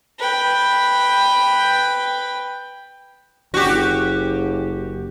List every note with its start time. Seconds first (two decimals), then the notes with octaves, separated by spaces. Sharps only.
0.19 B4 G5
3.54 F#1 F#4 G4